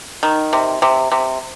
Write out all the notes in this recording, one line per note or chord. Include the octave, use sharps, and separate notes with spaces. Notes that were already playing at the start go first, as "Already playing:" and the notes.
D#3
C3
C3
C3